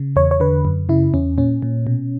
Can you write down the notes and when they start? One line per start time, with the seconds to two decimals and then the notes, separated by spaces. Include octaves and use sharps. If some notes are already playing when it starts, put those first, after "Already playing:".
Already playing: C#3
0.16 E2 C#5
0.31 C#5
0.40 D3 B4
0.65 F#2
0.89 C#3 E4
1.14 E2 C#4
1.38 A#2 C#4
1.62 A#2
1.87 B2